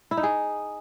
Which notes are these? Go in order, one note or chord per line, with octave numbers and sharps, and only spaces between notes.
E4
D#4
G#4